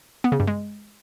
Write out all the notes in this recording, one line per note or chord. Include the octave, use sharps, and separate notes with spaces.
B3
C#3
G2
G#3